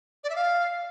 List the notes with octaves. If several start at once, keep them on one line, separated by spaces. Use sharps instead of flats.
D5
E5
F5